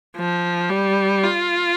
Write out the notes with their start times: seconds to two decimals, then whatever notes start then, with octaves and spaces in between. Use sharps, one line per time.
0.16 F3
0.70 G3
1.24 F4